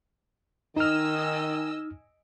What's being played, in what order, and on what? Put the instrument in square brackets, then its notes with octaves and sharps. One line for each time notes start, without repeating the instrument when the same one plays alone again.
[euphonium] D#3 [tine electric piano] D#4 F6 [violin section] D#5 G#5 E6